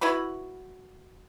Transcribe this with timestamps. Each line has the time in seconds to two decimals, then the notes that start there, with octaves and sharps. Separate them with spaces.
0.01 E4 F#4 B4 B5